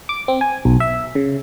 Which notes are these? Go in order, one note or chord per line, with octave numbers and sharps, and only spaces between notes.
D6
C4
G#5
B1
E5
C#3